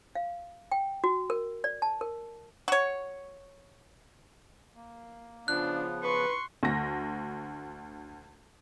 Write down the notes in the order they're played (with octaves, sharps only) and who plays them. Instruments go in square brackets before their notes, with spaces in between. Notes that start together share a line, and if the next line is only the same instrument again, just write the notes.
[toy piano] F5
G5
F#4
A#4
D5
A5
A#4
[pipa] F#4 C#5
[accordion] A#3
[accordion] C#3 F3 B3 [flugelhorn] D4 [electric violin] F4 [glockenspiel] F#6
[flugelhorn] B4 [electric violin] C6 C#6
[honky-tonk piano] D2 A#6